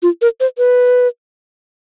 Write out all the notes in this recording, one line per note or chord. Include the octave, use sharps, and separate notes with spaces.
F4
A#4
C5
B4